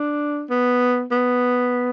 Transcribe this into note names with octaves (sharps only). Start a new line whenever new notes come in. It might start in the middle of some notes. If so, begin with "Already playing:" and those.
Already playing: D4
B3
B3